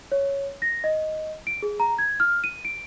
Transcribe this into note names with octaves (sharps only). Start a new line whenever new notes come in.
C#5
A#6
D#5
D7
G#4
A#5
G#6
F6
D#7
D7